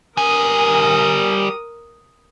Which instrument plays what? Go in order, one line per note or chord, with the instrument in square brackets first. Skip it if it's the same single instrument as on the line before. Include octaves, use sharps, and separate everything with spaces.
[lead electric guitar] G3 G#5 [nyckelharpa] A#4 D#6